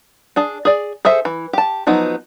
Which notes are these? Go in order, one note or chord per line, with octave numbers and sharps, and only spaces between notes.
D4 G#4 A5
G#4 D5
G#4 A4 C5 E5
E3
G4 A5
F3 F#3 B3 D#4